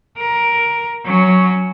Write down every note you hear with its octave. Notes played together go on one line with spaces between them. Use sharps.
A#4
F#3 C#4